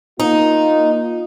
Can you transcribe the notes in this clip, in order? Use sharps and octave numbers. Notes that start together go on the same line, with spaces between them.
A#3 D#4 F4